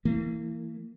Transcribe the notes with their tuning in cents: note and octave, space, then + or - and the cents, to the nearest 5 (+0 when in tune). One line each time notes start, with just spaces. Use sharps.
E3 +0 A#3 -35